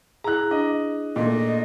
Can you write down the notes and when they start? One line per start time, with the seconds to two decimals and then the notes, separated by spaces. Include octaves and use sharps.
0.24 E4 G#4 A#5 F#6
0.51 D4 D#5
1.16 A#2 A3 D#5